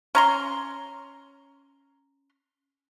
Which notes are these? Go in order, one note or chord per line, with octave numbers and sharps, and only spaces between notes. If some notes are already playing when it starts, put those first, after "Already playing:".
C#4 A#5 C6